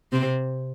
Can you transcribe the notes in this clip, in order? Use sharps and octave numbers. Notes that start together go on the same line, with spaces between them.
C3 C4